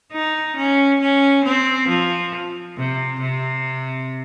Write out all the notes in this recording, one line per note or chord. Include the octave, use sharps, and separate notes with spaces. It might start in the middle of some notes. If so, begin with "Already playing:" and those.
D#4
C#4
C#4
C4
F3
C3
C3